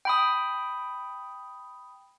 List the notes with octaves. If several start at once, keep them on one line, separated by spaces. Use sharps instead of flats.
G5 B5 D#6